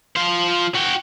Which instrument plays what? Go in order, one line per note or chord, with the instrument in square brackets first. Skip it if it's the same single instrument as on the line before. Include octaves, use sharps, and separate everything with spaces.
[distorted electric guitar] F3 C5
F#4 G5